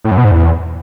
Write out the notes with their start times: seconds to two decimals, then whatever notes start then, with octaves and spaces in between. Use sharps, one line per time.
0.04 A2
0.11 F#2
0.18 B2
0.25 G#2
0.31 E2